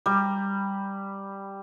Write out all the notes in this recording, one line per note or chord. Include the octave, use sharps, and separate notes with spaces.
G3 A#5